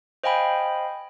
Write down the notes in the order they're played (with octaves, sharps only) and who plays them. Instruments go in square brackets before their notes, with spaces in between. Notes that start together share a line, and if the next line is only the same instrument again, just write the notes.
[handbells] C5 D#5 F5 G5 G#5 B5